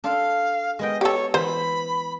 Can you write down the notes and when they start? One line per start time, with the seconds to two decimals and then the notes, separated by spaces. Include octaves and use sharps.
0.04 D4 A4 F5 C6
0.79 G#3 B3 D#5 G5
1.01 G4 A4 C#5
1.34 E3 C5 B5